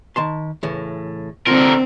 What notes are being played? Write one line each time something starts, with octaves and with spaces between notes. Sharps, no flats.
D#3 A5 C6
A2 C#3 E3
C2 D3 C4 F4 A#4